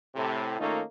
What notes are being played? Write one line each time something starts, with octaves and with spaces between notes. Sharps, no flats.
A2 C3
D#3 A3 A#3 C#4 D#4 F4